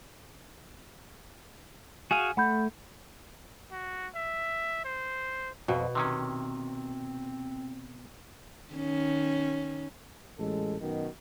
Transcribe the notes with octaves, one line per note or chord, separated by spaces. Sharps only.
F#4 G#4 F5 G#5 D#7
A3 F#5 B5 G6
F#4
E5
C5
F2 B2
C3 D#3 C4 C#4
D#3 C#4
A1 G#3 A4
F#2 B2 D#3